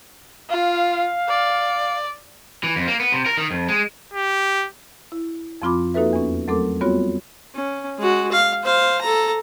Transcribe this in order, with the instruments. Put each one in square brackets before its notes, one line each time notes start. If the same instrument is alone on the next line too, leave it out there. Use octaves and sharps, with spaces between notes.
[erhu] F4 [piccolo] F5
[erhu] D5
[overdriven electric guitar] E3
F2
A#3
B3
C3
A#4
D#3
F2
G#3
[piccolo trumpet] G4
[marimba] E4
F2 F3 C4 F4 B5 D6
A#3 D#4 F#4 A4 B4 E5
E2 B3 C#4
F#3 A3 C4 A4 A#4 D6
G3 B3 C4 F4 F#4 C#5
[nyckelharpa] C#4
G#3 F#4
F5
C5 F5
A4 A#5